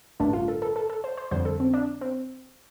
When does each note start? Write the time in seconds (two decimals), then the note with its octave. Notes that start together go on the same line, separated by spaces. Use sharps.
0.20 A1 G2 D3 A3 D4
0.33 F4
0.48 A4
0.62 A4
0.76 A4
0.90 A4
1.04 C5
1.17 C5
1.31 F2 D3 G3 C5
1.45 A4
1.60 C4
1.74 D4
2.01 C4